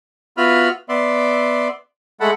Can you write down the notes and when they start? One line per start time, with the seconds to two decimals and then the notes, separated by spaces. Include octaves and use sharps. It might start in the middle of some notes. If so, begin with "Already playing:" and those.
0.37 B3 F4 F#4 E5 B5 F6
0.89 B3 D5 E5 C6
2.20 G#3 A3 A4 F#5 B5